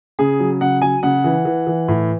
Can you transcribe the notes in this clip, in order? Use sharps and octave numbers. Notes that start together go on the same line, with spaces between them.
C#3 G#4
F#3
C#3 F#5
F#3 G#5
C#3 F#5
E3
E3
E3
A2